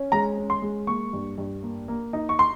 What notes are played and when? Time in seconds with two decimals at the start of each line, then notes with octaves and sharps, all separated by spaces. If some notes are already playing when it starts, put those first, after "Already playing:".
Already playing: C#4
0.12 G#3 A#5
0.37 C#4
0.50 C6
0.62 G#3
0.87 A#3 C#6
1.13 G2
1.38 G2
1.63 A#3
1.88 A#3
2.13 D#4
2.29 C#6
2.39 C6